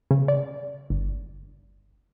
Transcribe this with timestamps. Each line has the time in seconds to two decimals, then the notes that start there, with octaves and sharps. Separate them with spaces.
0.11 C#3
0.28 D5
0.90 G1